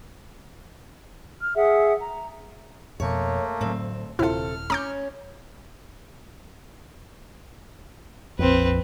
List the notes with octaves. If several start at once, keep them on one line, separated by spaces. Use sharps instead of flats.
F6
G#4 E5 F#5
A#5
F2 B2 A3 A#3 C#5
D2 A2 F#3 C4
D#1 C3 E4 F4 A4 F6
C#4 C#5 A#5 D6 G6
A#1 F2 C4 B4